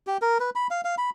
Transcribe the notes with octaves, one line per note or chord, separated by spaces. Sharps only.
G4
A#4
B4
B5
F5
F5
B5